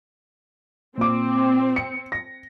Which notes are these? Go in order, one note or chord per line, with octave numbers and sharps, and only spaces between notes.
A#2 C4 D6
C#7
A#6